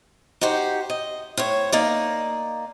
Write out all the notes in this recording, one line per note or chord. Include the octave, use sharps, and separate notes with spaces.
D#4 F#4 G4 C5
D#5
A2 C5 C#5
A#3 D#4 D5